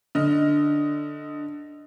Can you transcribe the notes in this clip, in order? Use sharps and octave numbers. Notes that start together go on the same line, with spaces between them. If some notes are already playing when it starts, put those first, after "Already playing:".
D3 D#5 F6